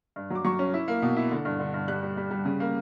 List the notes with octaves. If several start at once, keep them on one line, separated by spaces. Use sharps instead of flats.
G2
F#3 D6
F#3 C#6
C#4
E4
A#3
B2
E4
D3
G2
D3
G2
G3 F#6
G3
G3
G3
C#3
A#3